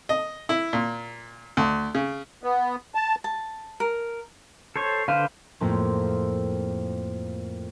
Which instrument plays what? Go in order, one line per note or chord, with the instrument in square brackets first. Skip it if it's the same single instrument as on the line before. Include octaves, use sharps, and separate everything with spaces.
[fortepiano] D#5
E4
A#2
D2
C#3
[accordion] B3
A5
[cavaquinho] A5
A#4
[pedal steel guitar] A4 C5 C#5
[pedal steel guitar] D3 B4 C5 [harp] F5
[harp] F2 A2 F3 A3 A#3 C4